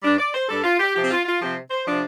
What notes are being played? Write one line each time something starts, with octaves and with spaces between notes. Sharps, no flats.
G2 G3 D4
D5
C5
G2 G3 D4 A4
F4
G4
C3 F3 C4 G4
F4
F4
C3 F3 C4 G4
C5
C3 F3 D4 D5